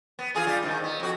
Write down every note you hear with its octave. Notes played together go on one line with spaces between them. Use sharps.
B3
E3 F4 G#4
G3 F4
G#2 C3 D#3
B3
F2 F#4